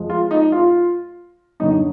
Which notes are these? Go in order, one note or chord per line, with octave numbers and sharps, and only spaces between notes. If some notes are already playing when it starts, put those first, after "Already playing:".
Already playing: F2 F3 G#3
F4
D#4
F4
F#2 D3 F#3 D#4